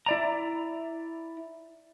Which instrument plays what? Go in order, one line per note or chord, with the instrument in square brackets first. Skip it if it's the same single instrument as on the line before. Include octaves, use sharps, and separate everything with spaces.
[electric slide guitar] E4 D5 A#5